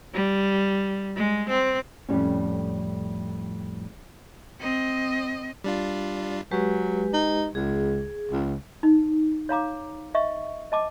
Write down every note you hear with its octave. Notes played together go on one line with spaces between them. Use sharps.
G3
G#3
C4
F2 A2 F3 G3 C4 C#4
C4 D#5
G3 D4 F4
F#3 G#3 G4 B4
D#4
C#2 G#4
C#2
D#4
C#5 F5 A#5 D6
D#5 E5 C#6
D#5 A5 D6